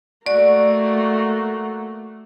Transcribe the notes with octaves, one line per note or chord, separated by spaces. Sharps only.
A3 A#3 F#4 D5